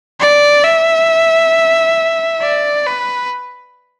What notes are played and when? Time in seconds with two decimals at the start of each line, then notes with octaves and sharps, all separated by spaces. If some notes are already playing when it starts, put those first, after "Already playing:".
0.20 D5
0.64 E5
2.42 D5
2.87 B4